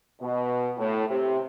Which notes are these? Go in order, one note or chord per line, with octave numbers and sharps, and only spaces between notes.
B2
A2
C3